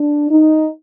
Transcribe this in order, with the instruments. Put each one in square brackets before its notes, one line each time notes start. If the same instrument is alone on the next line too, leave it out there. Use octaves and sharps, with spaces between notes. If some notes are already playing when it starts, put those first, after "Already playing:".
Already playing: [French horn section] D4
D#4